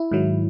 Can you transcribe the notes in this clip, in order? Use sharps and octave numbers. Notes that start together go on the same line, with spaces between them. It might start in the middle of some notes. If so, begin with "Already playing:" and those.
Already playing: E4
G#2 D#3 F#3